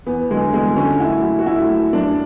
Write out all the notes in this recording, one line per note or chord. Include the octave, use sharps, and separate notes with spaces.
E2 B3
D3 F#3 G#3
E2 G#3
D3 F#3 C#4
A2 E4
F#3
F#4
A2 E4
F#3
F#2 D4